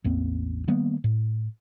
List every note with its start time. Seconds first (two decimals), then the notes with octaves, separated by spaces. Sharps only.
0.04 A1 E2 A#3 C4
0.68 D#3 G3 A#3 B3
1.04 A2